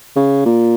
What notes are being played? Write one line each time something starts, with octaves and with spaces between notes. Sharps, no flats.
C#3
A#2